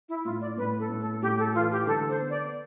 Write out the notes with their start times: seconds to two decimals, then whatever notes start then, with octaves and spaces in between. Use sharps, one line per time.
0.08 E4
0.24 A2 F4
0.41 D5
0.57 A2 B4
0.79 A4
0.89 A2
1.00 A4
1.22 A2 G4
1.38 A4
1.54 E3 F4
1.71 G4
1.87 D3 A4
2.09 C5
2.19 B3
2.30 D5